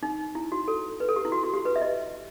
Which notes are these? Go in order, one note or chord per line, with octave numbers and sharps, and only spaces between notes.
D#4
E4
F#4
A4
B4
A4
G4
E4
F#4
F#4
G4
B4
E5
D#5